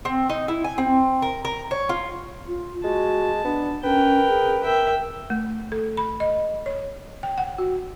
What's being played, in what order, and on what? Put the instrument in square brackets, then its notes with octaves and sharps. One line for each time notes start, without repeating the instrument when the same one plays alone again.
[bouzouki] C4
D#4
E4
G#5
C4
A#4
A#4
C#5
F4
[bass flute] F4
[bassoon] G#3 [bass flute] F#4 [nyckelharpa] A5
[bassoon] B3 [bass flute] D4
[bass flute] C#4 [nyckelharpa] A#4 G5 [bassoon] B4
[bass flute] G#4
[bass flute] A#4 [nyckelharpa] E5 G5
[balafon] A3
A4
B5
D#5
C#5
G5
F#5
F#4